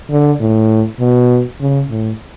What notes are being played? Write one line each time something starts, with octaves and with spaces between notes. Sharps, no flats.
D3
A2
B2
C#3
A2